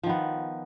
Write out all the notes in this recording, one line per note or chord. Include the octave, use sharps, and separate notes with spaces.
D#3 F3 B3